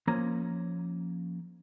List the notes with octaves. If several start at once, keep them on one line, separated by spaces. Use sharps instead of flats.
F3 A#3 C#4 A#5